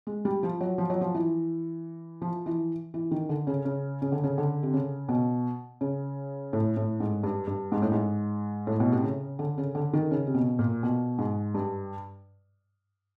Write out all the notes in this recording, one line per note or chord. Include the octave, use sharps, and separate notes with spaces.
G#3
G3
F3
F#3
F3
F#3
F3
E3
F3
E3
E3
D#3
D3
C#3
C#3
C#3
D3
C#3
D3
C3
C#3
B2
C#3
A2
A2
G#2
G2
G2
G#2
A2
G#2
A2
B2
C3
C#3
D3
C#3
D3
D#3
C#3
C3
B2
A#2
B2
G#2
G2